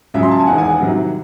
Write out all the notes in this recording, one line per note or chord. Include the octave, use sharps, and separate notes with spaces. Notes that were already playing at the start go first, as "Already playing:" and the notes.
C#2 C#3 F#3 E5
C6
A5
G#5
E1 E2 D#3 F#5
G#5
F#5
C2 C3 D#3 F#3